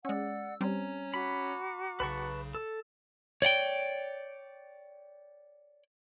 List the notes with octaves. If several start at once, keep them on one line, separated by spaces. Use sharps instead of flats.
G#3 C#4 D5 F#5 E6
G3 C4 C#4 C#5 A#5
F#4 A#5 B5 D6
B1 C#3 B4 A5 C#6
A4
C#5 D5 F#5 G5